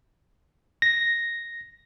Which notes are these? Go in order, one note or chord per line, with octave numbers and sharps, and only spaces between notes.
A#6